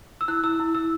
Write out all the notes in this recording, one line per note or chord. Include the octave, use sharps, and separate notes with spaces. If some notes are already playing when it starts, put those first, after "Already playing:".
E6
E4 F#6
E4 E6
E4
E4 E6